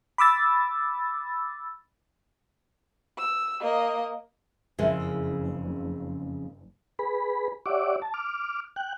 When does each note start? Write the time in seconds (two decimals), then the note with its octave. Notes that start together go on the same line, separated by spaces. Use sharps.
0.18 B5 D6 E6 A6
3.18 E6
3.60 A#3 D#5
4.78 F#1 F2 C#3 G#3 E4 A#4 E5
6.99 G#4 B4 B5
7.66 G4 C#5 D5 E5 F#5 D6
8.02 A5
8.14 D6 F6
8.76 G5 F#6